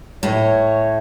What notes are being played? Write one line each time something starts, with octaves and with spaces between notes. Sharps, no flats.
A2 C#5